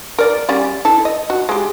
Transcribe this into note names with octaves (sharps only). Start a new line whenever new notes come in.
A#4 D5
G3 C#4 D5
E4 A4
D#5
F#4
G#3 G4